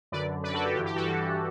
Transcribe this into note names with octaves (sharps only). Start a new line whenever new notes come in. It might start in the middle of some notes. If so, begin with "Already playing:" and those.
F#2 D3 B4 D5
F#2 D3 B4 D5
F#4 A4
G4
G2 E3 G4
G4
F#4 A4
G2 E3